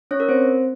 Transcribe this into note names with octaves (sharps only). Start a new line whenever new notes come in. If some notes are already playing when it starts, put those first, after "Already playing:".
C#4 C#5
A#4
C4 C5